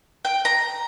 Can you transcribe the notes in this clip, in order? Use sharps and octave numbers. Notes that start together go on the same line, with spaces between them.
G5
A#5